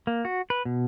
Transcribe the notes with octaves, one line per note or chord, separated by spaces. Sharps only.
A#3
F#4
B4
B2